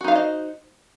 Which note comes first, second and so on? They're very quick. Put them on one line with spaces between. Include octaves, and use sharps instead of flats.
F#4 D#4 F5 C5 D#5